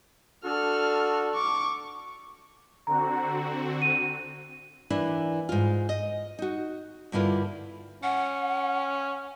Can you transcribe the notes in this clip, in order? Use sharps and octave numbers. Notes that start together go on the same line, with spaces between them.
D4 F#4 A4 F6
C#6 D6
D3 C4 F#4 A#5
D#7
E3 A#3 D4 E4
G#2 F4
D#5
D#4 F#4
G2 D3 A#3 E4 F4
C#4 F#5